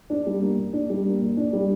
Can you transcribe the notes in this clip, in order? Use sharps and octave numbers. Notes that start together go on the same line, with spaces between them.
D4
G3
A#3
A#2
D4
G3
A#3
A#2
D4
G3